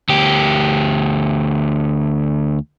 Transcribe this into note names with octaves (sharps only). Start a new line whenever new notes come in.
D2 G4